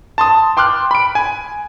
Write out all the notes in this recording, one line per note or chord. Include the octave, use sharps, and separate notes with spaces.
A5 C6 D#6
G5 C6 D6 F6 F#6
B5 D7
G#5